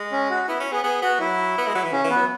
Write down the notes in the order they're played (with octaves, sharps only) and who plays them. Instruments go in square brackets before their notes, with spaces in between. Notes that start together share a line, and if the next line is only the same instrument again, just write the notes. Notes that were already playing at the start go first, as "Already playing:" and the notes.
Already playing: [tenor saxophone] G#3
[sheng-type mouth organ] C#4
F#4
[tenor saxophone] B3 [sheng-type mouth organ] E4
[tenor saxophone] C#4
[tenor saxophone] B3 [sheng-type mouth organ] G#4
[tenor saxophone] B3 [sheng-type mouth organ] G#4
[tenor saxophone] B3 [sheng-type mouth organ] F#4
[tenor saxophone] F#3 [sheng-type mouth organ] E4
[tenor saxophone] B3
G#3
F#3
E3
[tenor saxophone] C#3 [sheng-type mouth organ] C#4
[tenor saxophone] E3
[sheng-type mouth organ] B3
[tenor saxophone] F#3